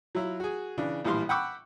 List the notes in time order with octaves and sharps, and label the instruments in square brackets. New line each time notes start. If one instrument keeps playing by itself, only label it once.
[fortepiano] F#3 E4 F4
F#4 G#4
C#3 E3 D4
A#1 A2 E3 G3 F5 C6
F#5 G5 B5 C#6 D6 E6